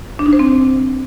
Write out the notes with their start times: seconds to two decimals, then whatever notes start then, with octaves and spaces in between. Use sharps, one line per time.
0.19 D4
0.26 D#4
0.33 C5
0.39 C4